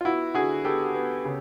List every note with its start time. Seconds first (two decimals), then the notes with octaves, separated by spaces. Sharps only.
0.01 F4
0.05 B3 E4 F#4
0.35 D3 F#4 G#4
0.65 B3 G4 A4
0.95 B3
1.25 C#3